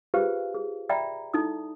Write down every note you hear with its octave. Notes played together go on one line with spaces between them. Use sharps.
F4 G4 G#4 B4 C5 F5
G#4
D5 E5 G5 A#5 B5
D#4 E4 A4 D#6